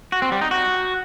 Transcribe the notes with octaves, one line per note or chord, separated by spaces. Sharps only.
F#4
C4
G3
D#4
F#4